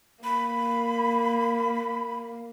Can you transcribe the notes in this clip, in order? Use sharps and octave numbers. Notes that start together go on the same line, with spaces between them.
A#3 B5